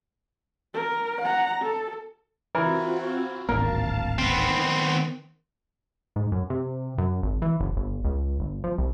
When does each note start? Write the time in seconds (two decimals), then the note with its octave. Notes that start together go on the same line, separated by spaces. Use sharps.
0.74 A#4
1.21 F#5 A#5
1.62 A4
2.55 E3 C4 F4 F#4 A#4
3.49 D1 G#1 A#3 A#4 F5 A5
4.19 D#3 B3 C4
6.16 G#2
6.32 F#2
6.50 C3
6.98 F#2
7.23 G#1
7.42 E3
7.60 F#1
7.77 G1
8.05 C#2
8.40 G1
8.64 F3
8.78 C2